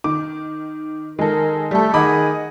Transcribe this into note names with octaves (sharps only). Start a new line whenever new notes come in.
D#3 D6
D#3 G#3 A4 A#4
G3 A3 A4
D#3 G#4 D#5 F#5 B5 D6